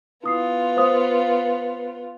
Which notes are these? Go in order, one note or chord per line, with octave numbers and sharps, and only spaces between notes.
B3 E4 F4 D#6 C7
C5 F5 D#6